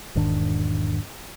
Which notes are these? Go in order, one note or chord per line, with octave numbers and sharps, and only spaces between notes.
E1 G#2 D#3 D4